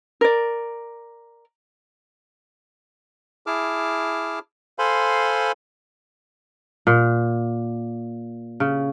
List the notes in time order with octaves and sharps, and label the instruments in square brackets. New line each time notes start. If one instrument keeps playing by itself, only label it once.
[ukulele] A#4 D5
[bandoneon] E4 G#4 A5 D6 F6
A4 C5 F5 G#5 B5 C6
[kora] A#2
C#3